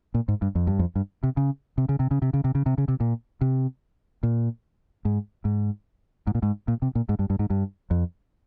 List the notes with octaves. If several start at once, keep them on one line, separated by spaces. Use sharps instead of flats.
A#2
G#2
G2
F2
G2
F2
G2
C3
C#3
C3
C#3
C3
C#3
C3
C#3
C3
C#3
C3
C#3
C3
A#2
C3
A#2
G#2
G#2
G#2
A#2
G#2
A#2
C3
A#2
G#2
G2
G2
G#2
G2
F2